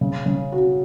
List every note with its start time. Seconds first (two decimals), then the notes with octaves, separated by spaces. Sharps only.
0.01 C#3
0.26 C#3
0.52 F#4